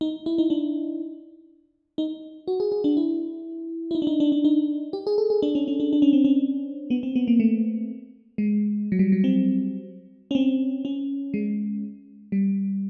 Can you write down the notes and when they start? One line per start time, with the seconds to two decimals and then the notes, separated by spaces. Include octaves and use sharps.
0.01 D#4
0.26 E4
0.38 D#4
0.50 D4
1.98 D#4
2.48 F#4
2.60 G#4
2.72 G#4
2.84 D4
2.97 E4
3.91 E4
3.95 D#4
4.02 D4
4.07 D#4
4.20 D4
4.32 D4
4.44 D#4
4.93 G4
5.07 G#4
5.18 A4
5.30 G#4
5.42 D4
5.55 C#4
5.68 C#4
5.80 D4
5.93 D4
6.02 C#4
6.13 C4
6.25 C#4
6.90 B3
7.03 C4
7.16 B3
7.28 A#3
7.40 A3
8.38 G#3
8.92 F#3
8.99 G3
9.12 F#3
9.24 C4
10.31 C#4
10.35 C4
10.85 C#4
11.34 G#3
12.32 G3